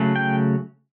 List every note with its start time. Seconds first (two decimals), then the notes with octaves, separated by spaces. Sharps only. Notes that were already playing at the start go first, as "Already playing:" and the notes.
Already playing: C#3 F#3 A3
0.16 G5